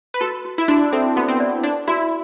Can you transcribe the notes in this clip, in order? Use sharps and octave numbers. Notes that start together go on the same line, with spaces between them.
B4
F#4 A4
F#4
E4
D4 F#4
C4 A4
B3 F#4
C4
D5
D4 D5
E4 F#4